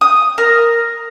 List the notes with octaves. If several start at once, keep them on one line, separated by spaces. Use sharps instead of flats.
D#6
A#4